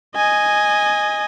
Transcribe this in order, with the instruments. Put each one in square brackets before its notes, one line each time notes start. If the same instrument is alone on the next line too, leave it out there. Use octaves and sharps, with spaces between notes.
[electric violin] D#5 G#5